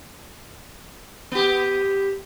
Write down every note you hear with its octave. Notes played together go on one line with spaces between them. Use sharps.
B3 G4